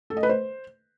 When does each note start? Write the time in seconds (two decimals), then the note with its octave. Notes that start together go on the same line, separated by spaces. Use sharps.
0.10 A4
0.17 D#5
0.23 B4
0.29 C5